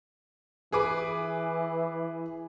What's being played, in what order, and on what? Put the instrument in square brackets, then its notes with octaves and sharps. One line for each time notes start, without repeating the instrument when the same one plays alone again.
[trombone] E3 [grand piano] G#4 B4 D6